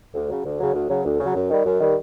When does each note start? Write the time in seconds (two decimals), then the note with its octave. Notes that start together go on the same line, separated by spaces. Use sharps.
0.14 D2
0.30 C#3 F#3
0.45 D2
0.59 C#3 F#3
0.74 D2
0.89 C#3 F#3
1.05 D2
1.20 C#3 F#3
1.35 F#2
1.51 D#3 G3
1.66 F#2
1.81 D#3 G3